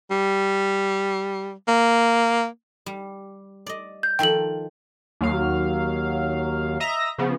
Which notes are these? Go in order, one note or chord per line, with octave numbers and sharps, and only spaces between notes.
G3
A#3
G3
D5 D#5
G6
D#3 F3 A4 G5 F#7
D#2 F#3 F5
D#5 E5 A#5 A#6
C#3 F3 B3